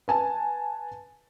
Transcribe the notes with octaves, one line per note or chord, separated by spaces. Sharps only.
B4 G#5 A5